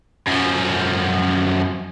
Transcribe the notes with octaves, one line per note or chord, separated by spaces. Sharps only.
F#2 F3